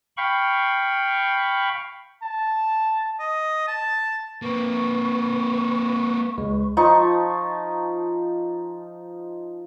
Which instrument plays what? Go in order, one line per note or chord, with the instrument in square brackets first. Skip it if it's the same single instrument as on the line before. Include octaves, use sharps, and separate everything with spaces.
[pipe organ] F5 G5 B5 C#6
[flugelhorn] A5
[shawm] D#5
A5
[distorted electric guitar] A#3 C4 [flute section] B4 C#6
[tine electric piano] C#2 G#3
[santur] F3 D#4 C#6